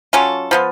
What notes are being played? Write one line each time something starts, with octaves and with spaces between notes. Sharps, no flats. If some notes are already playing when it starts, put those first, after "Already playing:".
F#3 C#4 F4 A4
F3 B3 F4